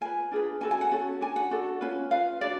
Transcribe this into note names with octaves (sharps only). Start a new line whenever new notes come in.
F4 B4 G#5
D4 F4 G#4 B4
C#4 F#4 A4 G#5
G#5
F#5
C#4 F#4 A4
D4 F#4 G#5
F#5
D4 F#4 A4
C#4 F4 B4
F4 B4 F5
D4 F#4 B4 D5